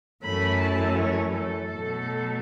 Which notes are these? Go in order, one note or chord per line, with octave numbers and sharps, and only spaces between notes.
F#2 E3 A3 C#4 B5
A5
C#5
A4
B2 F#3 A3